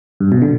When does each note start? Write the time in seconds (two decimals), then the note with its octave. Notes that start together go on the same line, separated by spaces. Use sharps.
0.20 G2
0.32 B2
0.42 D3